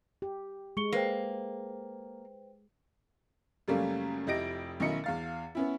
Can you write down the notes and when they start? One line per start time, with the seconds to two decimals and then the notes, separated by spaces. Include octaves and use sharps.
0.22 G4
0.77 G#3 C#6 C#7 G7
0.92 A#3 B4 C5 G5
3.68 F#2 C#3 G3 A3 A#3 C#4
4.27 F1 E4 G4 D#5 A#6 D7
4.80 B1 D#3 C#4 E4 D#5 C#7
5.04 E2 F5 A6
5.55 B3 C#4 E4